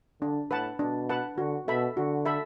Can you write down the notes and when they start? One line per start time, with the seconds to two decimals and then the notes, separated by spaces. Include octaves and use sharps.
0.21 D3 D4
0.50 A2 B4 F#5 A5
0.79 B2 D4
1.09 B4 F#5 A5
1.38 D3 F#4
1.67 B2 A4 E5 B5
1.97 D3 F#4
2.25 A4 E5 B5